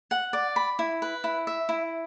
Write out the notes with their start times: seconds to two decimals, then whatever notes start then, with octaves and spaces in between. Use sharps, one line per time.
0.11 F#5
0.33 D5
0.56 B5
0.79 E4
1.02 B4
1.24 E4
1.47 E5
1.69 E4